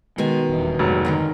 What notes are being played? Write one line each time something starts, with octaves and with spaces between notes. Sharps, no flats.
B2 D#3 G#3 G#5
D#1 E2
F1 G#2 F#3
D3 D#3 A#4